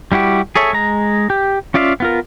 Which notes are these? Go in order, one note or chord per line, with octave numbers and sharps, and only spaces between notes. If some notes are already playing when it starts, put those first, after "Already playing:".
G3 E4 F#4 G4
G#4 A4 C#5 E5
G#3 A#5
G4
C#4 F4 D5 E5 F5
B3 F4 A#4